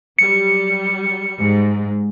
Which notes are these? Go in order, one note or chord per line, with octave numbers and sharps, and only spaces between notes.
F#3 G3 C#7
G#2